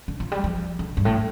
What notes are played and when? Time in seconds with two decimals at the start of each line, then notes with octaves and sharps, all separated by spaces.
0.08 D3
0.20 F3
0.32 G3
0.44 F3
0.79 D3
0.97 G2
1.05 A2